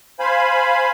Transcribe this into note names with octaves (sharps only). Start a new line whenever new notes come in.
C5 F5 G#5 B5